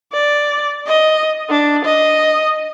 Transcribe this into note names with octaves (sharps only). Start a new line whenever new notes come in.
D5
D#5
D4
D#5